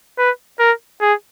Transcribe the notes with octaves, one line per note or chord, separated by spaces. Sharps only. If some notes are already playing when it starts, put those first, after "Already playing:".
B4
A#4
G#4